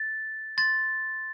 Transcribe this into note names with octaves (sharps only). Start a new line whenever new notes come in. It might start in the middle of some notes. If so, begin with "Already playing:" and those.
Already playing: A6
C6 A6